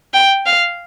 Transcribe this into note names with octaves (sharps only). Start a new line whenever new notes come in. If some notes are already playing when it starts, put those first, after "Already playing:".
G5
F5